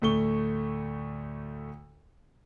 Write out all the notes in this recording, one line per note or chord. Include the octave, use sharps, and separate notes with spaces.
D2 A2 A3 C#6 G7